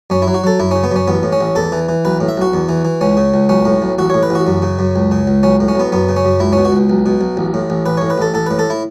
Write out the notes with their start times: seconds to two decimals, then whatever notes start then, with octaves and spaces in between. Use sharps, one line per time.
0.10 F#2 C#4
0.22 E4
0.27 F#3
0.34 F#4
0.44 F#3 A4
0.60 F#2 E4
0.71 C#3 C#4
0.83 B3
0.91 F#2 C#4
1.07 A1 B3
1.23 A2
1.32 C#4
1.41 A1
1.55 E2 A4
1.72 E3
1.89 E3
2.05 B1 B4
2.21 A2
2.28 E5
2.37 B1 F#4
2.54 E2
2.69 E3
2.85 E3
3.01 C#2 C#4
3.17 C#3
3.34 C#2
3.49 B1 C#4
3.65 A2
3.82 B1
3.98 A1 F#4
4.10 A2 C#5
4.23 B4
4.30 A1 F#4
4.47 F#2
4.62 C#3
4.79 F#2
4.96 C#2
5.11 C#3
5.27 C#2
5.43 B1 C#4
5.60 A2
5.68 C#4
5.75 B1 B3
5.92 F#2 B3
6.09 C#3
6.16 C#4
6.25 F#2
6.40 C#2 E4
6.53 B2 C#4
6.65 F#4
6.72 C#2
6.90 B1
7.06 B2
7.21 B1
7.37 A1
7.54 A2
7.70 A1
7.86 A1 B4
7.97 A2 C#5
8.10 B4
8.18 A1 A4
8.34 A1 A4
8.46 A2 B4
8.59 A4
8.70 E4